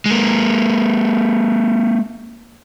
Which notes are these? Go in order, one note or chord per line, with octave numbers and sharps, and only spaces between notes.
G#3 A#3